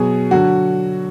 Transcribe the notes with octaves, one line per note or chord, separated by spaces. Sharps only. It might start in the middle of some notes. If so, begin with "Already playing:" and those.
Already playing: B2 F#3 G#4
D3 F#3 F#4